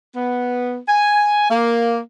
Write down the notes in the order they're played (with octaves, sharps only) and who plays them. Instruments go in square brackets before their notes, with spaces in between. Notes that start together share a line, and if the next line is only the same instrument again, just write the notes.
[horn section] B3
G#5
A#3